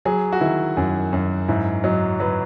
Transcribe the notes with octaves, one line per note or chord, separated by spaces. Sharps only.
F#3 G#4
F#4
D#3 E4
F#2
F#2
G#2 E4
F#3 D#4
F#3 B4